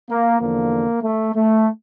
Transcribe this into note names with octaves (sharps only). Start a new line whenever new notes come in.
A#3
E2 D3 F3 A#3
A3
A3